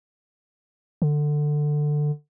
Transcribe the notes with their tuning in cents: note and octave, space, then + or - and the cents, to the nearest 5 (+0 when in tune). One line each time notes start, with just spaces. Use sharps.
D3 +15